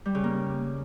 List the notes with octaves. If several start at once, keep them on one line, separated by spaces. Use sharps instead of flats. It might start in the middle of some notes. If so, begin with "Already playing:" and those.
G3
C#3
A#3